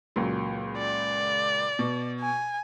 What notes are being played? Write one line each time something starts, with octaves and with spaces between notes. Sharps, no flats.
C#2 A#2 F#3
D5
B2
G#5